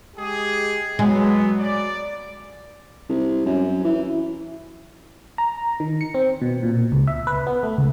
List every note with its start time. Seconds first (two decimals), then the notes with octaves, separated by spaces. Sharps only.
0.17 G#3 G4 G#4
0.99 F#3 G#3 B3
1.59 D5
3.09 C2
3.46 F#2
3.85 E3
5.38 A#5
5.80 D#3
6.01 C#7
6.14 C4
6.42 B2
6.63 A#2
6.92 C#2
7.07 E5
7.27 B4
7.47 B3
7.63 A3
7.78 C#2